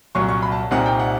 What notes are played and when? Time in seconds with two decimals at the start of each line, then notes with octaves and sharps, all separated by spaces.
0.15 C2 A#2 F#3 C#6
0.29 C#6
0.42 B5
0.52 A5
0.71 C2 A#2 G3 C4 D#4 F#5
0.86 G5
0.99 F#5